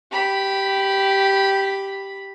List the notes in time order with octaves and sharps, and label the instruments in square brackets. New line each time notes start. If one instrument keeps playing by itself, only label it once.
[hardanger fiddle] G4 B5